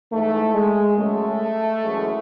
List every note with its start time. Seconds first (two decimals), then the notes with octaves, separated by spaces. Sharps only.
0.11 G#2 E3 G#3 A3
0.53 G#3
0.96 F#2 C#3 G#3 A3
1.82 F#2 E3 G#3